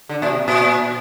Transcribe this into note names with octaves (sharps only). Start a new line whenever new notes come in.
D3
A#2
C3
A#2